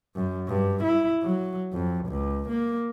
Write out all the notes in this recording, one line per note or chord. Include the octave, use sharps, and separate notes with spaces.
F#2
G2
E4
F#3
F2
C#2
A#3